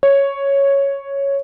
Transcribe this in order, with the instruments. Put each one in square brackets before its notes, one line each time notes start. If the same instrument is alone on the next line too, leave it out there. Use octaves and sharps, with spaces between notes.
[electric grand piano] C#5